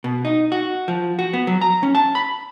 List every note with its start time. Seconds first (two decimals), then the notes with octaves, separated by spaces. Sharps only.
0.04 B2
0.25 D#4
0.52 F#4
0.88 F3
1.19 F#4
1.33 B3
1.47 F#3
1.61 A#5
1.83 C#4
1.95 A5
2.15 B5